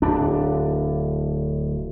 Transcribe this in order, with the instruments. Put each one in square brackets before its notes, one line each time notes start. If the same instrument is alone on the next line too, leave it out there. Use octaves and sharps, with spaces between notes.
[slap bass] D1 D4